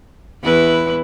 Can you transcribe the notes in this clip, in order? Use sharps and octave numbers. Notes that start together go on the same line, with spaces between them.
E2 E4 B4